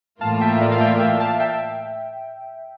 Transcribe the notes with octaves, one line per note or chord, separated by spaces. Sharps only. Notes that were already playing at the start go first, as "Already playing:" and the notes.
A2 E3 A#3 F4 F5 A5
E5 G5
A#4 D5
F5
E5 G5
E5 G5
F5 A5
E5 G5